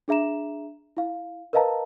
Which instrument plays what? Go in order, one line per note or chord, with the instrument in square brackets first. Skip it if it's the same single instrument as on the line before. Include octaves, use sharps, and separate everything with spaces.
[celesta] D4 G#4 E5 A#5 E7
E4 F5
A#4 B4 D#5 F5 A5 A#5